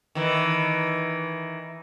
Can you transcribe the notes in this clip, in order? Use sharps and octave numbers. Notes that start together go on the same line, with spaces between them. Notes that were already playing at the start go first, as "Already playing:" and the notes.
D#3 E3